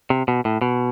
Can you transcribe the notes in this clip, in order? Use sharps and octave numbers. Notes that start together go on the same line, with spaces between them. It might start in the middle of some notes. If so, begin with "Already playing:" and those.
C3
B2
A2
B2